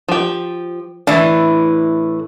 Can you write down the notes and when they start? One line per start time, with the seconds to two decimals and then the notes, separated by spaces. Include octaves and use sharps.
0.08 F3 G4
1.07 A2 E3 D4